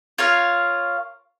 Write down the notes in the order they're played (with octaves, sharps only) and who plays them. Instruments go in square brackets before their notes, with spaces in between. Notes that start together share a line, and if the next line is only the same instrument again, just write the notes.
[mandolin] F4 A#4 C#5 F5